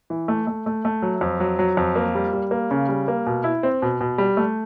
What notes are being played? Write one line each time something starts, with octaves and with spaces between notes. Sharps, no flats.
E3
A3
A3
A3
A3
F#3
F2
F#3
F#3
F2
A#3
G3
G3
A#3
C#3
G3
A#3
B2
E4
C4
B2
B2
G3
A3